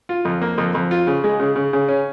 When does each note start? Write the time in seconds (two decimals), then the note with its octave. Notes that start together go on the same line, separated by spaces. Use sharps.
0.09 F4
0.25 F2
0.41 A#3
0.58 F2
0.75 F2
0.91 F4
1.07 C#3
1.24 G#3
1.40 C#3
1.56 C#3
1.73 C#3
1.88 C#4